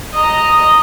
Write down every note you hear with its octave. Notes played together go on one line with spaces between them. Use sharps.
D#5 A#5